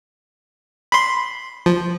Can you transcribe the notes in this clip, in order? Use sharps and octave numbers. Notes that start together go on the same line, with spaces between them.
B5 C6
F3